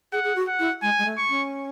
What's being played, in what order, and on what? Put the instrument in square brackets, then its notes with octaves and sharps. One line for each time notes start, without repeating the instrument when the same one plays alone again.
[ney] G#4 [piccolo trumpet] F#5
[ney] G#4
F#4
[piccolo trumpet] F#5
[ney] E4
[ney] G#3 [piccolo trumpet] G#5
[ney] G#3
A3
[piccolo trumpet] C#6
[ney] C#4